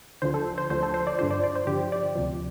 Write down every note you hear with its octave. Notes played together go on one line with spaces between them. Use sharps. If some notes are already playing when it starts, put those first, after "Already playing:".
D2 D3 F3 C5
A4
C5
D2 D3 F3 C5
A4
C5
D5
G2 D3 F3 C5
D5
D5
C5
G2 D3 F3 G4
D5
D2 C3 F3